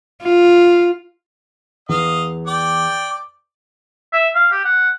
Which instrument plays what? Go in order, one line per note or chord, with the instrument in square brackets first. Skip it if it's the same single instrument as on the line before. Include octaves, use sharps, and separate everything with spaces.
[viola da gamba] F4
[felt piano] E2 [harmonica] D#5 F5
[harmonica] D5 G5 D6
[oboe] E5
F5
G4
F#5